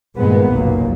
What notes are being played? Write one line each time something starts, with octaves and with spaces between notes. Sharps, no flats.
G2 A#2 D#3 G#3 A#3 B3
F1 B1 F#2 A#2 A#3